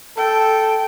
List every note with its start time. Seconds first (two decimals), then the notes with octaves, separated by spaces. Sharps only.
0.17 A4 G5